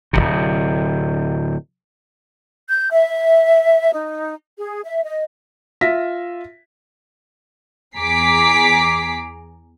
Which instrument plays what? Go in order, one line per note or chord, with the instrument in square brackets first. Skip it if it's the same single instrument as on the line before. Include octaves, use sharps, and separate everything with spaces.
[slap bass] D1 G#1 C3
[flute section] G6
E5
D#4
G#4
E5
D#5
[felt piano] F4 E5 A#6 B6
[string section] E2 G#4 A#5 D6 B6 C7